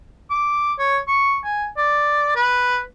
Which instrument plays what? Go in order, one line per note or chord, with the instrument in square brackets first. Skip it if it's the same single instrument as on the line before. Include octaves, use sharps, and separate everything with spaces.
[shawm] D6
C#5
C#6
G#5
D5
B4